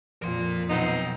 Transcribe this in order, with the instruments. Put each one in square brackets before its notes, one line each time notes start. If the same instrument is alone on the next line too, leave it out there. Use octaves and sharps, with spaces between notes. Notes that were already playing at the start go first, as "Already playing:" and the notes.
[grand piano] F2 A#2 [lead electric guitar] A#4 C6
[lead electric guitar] B2 F#3 [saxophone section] B3 C4 D#4